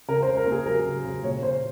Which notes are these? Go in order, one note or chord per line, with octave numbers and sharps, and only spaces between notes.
C#3 A#4
C5
C#3
A#4
A#3 G#4
F#3 A#4
C#3
C#3
A#2 C#5
A#2 C5